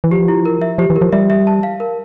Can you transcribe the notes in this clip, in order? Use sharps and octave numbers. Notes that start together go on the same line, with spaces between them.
E3
F3 G4
E4
A#4
E5
F3 G4
E3
A#4
F3
G3 E5
E5
A5
F5
A#4